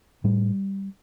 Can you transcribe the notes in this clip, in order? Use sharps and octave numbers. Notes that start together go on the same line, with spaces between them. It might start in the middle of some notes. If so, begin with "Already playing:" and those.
A2 G3